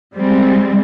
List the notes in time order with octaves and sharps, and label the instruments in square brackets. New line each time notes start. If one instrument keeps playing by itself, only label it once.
[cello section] G3 G#3 C4